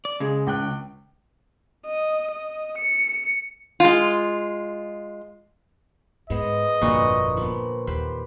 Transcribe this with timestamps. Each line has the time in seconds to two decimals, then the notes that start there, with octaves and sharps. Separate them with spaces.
0.05 D5
0.20 C#3 G#3
0.47 C#2 G5 F#6
1.86 D#5
2.31 D#5
2.78 C#7
3.80 G#3 F4
6.30 G#2 G#3 B3 C5 D#5
6.81 G1 F2 A#2 D3 B3 F#4 C#6
7.37 F3 A#3 B3
7.87 D#2 G4 B4 C5